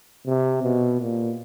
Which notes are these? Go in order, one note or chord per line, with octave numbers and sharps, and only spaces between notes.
C3
B2
A#2